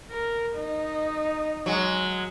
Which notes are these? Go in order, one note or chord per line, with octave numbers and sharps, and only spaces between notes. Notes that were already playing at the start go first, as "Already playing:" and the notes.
A#4
D#4
F#3 G#3